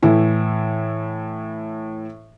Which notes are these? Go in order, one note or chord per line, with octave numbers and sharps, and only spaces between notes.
A2 E3 E4